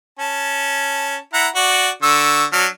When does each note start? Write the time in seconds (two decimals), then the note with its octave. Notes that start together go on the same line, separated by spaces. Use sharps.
0.19 C#4 A5
1.33 E4 F#5 A#5
1.56 F#4 D5
2.03 D3 C#6 E6
2.53 F#3 D4 F6